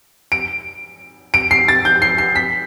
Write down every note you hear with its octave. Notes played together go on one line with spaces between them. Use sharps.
D7
D7
C7
A6
G6
C7
C7
B6